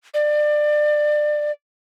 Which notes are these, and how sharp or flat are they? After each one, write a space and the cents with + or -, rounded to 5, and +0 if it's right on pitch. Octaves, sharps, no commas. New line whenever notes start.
D5 +25